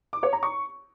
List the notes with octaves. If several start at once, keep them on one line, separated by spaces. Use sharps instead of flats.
D6
C#5
A#5
C#6